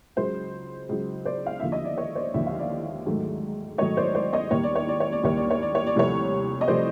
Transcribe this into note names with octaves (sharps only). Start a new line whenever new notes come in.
C#2 C#3 F#3 C5
C#2 C#3 F#3
C5 D5
F5
D#2 D3 F3 A#3 E5
D#5
D5
C#5
C5 D5
D#2 D3 F3 A#3 E5
F5
D5 E5
G#2 D#3 F#3 A3
G#2 D#3 F#3 A3 C#5 D#5
C5 D5
C5 D5
C#5 D#5
D#2 D#3 G3 A#3 C#5
D5
C#5
D5
C#5
D5
D#2 D#3 G3 A#3 C#5
D5
C#5
D5
C#5
D5
C2 C3 F3 A3 C#5
D#5
C3 F3 A3 C5 D5